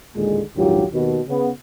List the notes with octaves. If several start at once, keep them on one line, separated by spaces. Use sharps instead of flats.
A1 D#2 A#2 D3 G#3
A#1 D#2 G#2 F#3 F4 G4
D#2 B2
C#3 B3